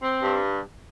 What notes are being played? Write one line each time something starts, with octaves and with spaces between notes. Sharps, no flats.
C4
G2